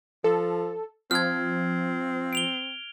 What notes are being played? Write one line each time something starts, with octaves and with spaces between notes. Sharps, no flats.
F3 A4
F3 C4 F6 G#6
D7 F7 G7